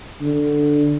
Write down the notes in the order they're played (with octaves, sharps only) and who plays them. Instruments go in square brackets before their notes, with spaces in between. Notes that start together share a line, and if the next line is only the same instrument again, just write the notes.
[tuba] D3